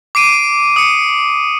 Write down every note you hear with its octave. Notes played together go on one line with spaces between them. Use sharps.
D6 C7 D7 D#7
D#6 C#7